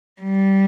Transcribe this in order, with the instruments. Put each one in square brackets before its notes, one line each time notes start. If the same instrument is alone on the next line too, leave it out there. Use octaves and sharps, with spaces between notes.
[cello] G3